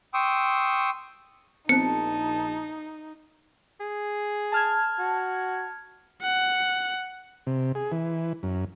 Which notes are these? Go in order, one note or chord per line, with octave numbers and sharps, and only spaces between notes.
G5 C6 C#6 D#6 E6
A#1 B3 C4 D#4 A5 C#7
G#4
A5 F6 G#6
F#4
F#5
C3
G#4
E3
F#2